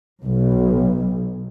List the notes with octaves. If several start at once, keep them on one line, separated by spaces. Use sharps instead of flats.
B1